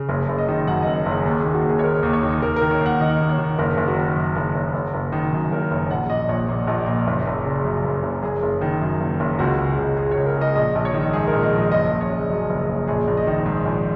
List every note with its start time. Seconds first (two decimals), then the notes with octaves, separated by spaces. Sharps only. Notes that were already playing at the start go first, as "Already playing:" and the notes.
Already playing: C#3
0.09 F#1 G#4
0.29 F#1
0.38 D#5
0.48 D#3
0.67 F#2 F#5
0.82 F#1 D#5
1.06 F#1 G#4
1.25 D#2
1.40 D#3 G#4
1.54 F#4
1.65 D#2 G#4
1.79 C#5
1.84 D#3 A#4
2.03 D#2
2.13 C#5
2.23 D#3
2.41 D#2 A#4
2.56 D#3 A#4
2.71 C#5
2.81 D#2
2.86 F#5
3.00 D#3 D#5
3.20 D#2
3.29 C#5
3.38 D#3
3.58 F#1 A#4
3.77 F#1
3.88 F#4
3.96 D#3
4.17 F#2
4.36 F#1
4.55 F#1
4.74 F#1
4.94 F#1
5.12 D#3
5.33 F#2
5.51 F#1 A#4
5.71 F#1 C#5
5.91 A#1 F#5
6.10 A#2 D#5
6.29 A#1 C#5
6.49 A#2
6.67 A#1
6.87 A#2
7.07 F#1
7.27 F#1
7.45 C#3
7.64 F#2
7.84 F#1
8.03 F#1
8.23 F#1 G#4
8.43 F#1
8.61 D#3
8.81 F#2
9.00 F#1
9.20 F#1
9.39 C#2 F#4
9.58 C#3
9.79 C#2
9.97 C#3 G#4
10.11 C#5
10.17 C#2
10.26 A#4
10.36 C#3
10.41 D#5
10.56 A#1 D#5
10.75 A#1
10.85 C#5
10.94 D#3
11.13 G#2 G#4
11.28 A#4
11.33 A#1
11.43 D#5
11.53 A#1
11.58 D#5
11.72 F#1 D#5
11.91 F#1
12.01 C#5
12.10 C#3
12.30 F#2
12.50 F#1
12.69 F#1
12.87 A#1 G#4
13.08 A#1
13.17 D#5
13.27 D#3
13.46 G#2
13.66 A#1